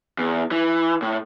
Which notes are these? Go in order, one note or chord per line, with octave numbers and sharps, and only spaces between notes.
E2
E3
A2